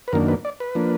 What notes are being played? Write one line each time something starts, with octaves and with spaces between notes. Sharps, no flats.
B4
F#2 D#3 A#3 D4 A#4
B4
D5
B4
F3 A#3 D4